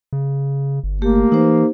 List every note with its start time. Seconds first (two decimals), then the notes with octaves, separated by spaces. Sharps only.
0.13 C#3
0.84 G1
1.02 A3 A#3 G4
1.32 E3 D#4 G4 C5